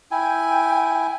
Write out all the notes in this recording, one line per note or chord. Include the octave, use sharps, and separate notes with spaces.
E4 G5 G#5